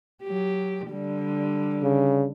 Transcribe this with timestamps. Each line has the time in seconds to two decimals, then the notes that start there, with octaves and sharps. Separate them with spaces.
0.24 F#3 G4
0.90 D3 G3
1.83 C#3